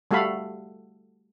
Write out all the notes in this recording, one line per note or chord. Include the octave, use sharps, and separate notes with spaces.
G3 A3 F#4 A4 F5 B5